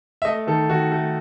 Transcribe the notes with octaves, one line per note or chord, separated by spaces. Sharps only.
E5
A3 D#5
D#3 A4
D#3 F#4
A3